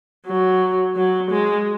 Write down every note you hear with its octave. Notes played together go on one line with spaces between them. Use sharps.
F#3
F#3
G#3